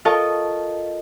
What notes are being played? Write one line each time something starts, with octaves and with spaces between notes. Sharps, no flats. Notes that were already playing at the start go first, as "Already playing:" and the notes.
F4 A4 A#4 D#5 A5 C#6